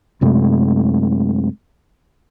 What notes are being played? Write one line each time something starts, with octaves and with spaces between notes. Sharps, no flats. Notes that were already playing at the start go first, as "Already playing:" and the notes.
F#2 C3 G#3 A3